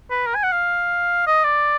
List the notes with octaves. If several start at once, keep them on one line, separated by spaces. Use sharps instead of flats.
B4
A#4
G#5
F#5
F5
D#5
D5